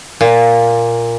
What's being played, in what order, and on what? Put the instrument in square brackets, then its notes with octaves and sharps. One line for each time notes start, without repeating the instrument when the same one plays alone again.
[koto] A#2